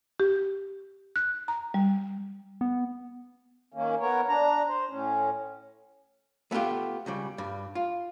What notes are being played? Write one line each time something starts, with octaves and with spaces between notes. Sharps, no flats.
G4
F#6
A#5
G3
B3
D#3 A#3 C#4
B3 A#4 C#5
D4 A#5
C5
A2 C#4
A3 B3 E4 F4 G4
C#2 C#3 G3
G2 G3
F4